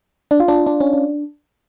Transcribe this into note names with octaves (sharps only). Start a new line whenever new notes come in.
D4
F4
D4
D4
C#4
D4